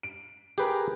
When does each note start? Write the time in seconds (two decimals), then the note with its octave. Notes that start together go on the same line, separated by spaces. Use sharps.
0.03 D7
0.58 G4 G#4 A#4 B4